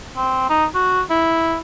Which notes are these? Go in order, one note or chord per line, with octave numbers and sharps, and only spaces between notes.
C4
D#4
F#4
E4